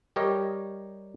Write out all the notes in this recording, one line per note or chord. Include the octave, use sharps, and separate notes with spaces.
G3 G4 A#4 C#5 D#5